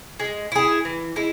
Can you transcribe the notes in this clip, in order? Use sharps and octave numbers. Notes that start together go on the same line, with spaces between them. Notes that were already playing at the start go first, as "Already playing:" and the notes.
G#3
E4 G#4
E3
G#3 E4